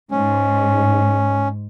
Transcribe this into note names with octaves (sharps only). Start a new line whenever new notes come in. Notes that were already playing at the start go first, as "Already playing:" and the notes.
G#2 C#4